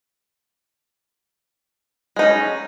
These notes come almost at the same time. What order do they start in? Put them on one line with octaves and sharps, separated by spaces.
G#3 D#4 C#4